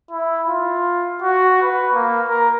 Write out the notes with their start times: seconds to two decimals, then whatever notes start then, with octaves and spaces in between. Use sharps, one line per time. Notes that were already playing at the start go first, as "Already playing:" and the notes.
0.11 E4
0.48 F4
1.22 F#4
1.62 B4
1.94 A#3
2.28 A#4